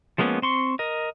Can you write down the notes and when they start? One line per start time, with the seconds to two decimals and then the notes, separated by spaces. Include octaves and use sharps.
0.18 F3 G#3 A#3 B3 C#4
0.42 C4 C6 C#6
0.79 A#4 D#5